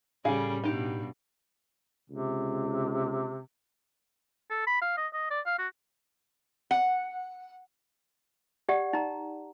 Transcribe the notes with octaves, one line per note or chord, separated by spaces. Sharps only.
A2 C#3 G3 C#4 G#4 A4 F5
G2 B2 D#4 G4
C#2 C3
A4
B5
F5
D#5
D#5
D5
F5
F#4
F#5
G4 D5 F#5
D#4 A#5